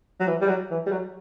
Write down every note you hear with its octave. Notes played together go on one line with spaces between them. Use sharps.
F#3
E3
G3
F#3
E3
G3
F#3